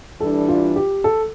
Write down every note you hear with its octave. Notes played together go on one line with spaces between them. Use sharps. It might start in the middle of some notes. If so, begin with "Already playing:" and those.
E3 G3 D4 A4
F4
G4
A4